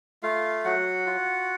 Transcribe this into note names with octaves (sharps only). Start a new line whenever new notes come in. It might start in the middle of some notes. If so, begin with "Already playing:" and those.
A3 F4 F5
F#3 F#4 F#5
F4